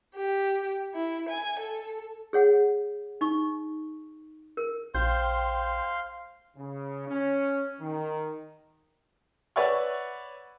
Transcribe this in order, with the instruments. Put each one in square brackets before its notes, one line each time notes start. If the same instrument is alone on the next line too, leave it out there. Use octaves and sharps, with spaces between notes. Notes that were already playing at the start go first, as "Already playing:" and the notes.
[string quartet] G4
E4
G#5
A4
[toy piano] G#4 C#5 F#5
D#4 C#6
A#4
[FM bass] A#1 [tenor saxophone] C5 [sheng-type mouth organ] F5 C6 [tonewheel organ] G5
[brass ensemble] C#3
C#4
D#3
[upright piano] B4 C#5 D5 E5 F#5 C#6